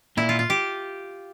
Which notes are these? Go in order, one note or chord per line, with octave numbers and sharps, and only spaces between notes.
A#2 E4
F4
F4
G4